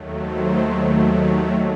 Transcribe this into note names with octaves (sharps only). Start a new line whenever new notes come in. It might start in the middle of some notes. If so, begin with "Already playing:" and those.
Already playing: D#2 D#3 F#3 A3
C5